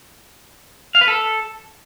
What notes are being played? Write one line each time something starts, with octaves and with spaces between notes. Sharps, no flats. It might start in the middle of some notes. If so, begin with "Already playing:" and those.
F5
B4
A4